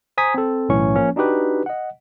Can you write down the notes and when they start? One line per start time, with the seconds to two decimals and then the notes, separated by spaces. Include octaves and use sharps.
0.18 C5 G#5 A#5 D#6 G#6 B6
0.34 C4 A4
0.69 B1 A2 E3 C#4 C#6
0.95 F3 A#3 C#4
1.16 D4 D#4 F#4 G4 B4
1.66 D#5 F#5